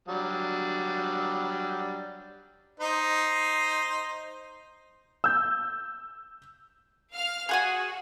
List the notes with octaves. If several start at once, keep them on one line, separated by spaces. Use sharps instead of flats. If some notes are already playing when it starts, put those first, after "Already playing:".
F#3 G3 D4
D#4 C5
E6 G6
F5 F6
F#4 G#4 F#5 G#5